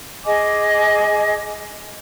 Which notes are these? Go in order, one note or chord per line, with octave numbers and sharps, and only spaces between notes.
G#4 D#5 G#5 D6